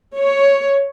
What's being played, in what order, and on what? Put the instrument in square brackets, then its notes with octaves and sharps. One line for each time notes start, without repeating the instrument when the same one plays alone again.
[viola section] C#5